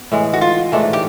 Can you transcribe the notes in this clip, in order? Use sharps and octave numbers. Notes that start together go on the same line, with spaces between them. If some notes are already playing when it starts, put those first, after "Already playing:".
Already playing: B3
A2 E3 G#3
F#4
F4
G#2 E3 A3 D4
G4